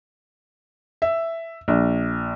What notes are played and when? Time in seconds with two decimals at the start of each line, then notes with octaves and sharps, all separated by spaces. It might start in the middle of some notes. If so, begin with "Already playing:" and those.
1.02 E5
1.68 A#1